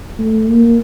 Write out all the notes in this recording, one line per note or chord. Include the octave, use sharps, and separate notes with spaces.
A3
A#3